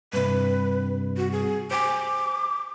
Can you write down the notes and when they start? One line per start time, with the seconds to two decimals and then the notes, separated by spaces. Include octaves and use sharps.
0.13 G2 C3 B4
1.17 F#4
1.32 G#4
1.71 C5 G#5 D6